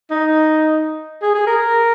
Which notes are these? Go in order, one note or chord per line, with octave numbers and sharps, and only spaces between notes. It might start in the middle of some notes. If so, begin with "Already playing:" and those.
D#4
G#4
G#4
A#4